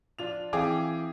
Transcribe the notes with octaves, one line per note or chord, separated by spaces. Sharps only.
F3 D4 F4 F7
E3 C4 G#4 F5 G5 D6